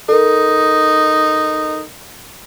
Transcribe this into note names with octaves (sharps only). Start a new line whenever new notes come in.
D#4 A4 A#4